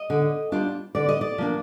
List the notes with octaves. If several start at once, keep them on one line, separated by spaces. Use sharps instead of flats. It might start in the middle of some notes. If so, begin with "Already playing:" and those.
Already playing: D#5
D3
G3 D4 F4
D3 D5
D#5
D5
F3 A#3 D4